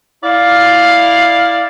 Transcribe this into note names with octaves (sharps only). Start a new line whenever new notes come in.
E4 D5 F5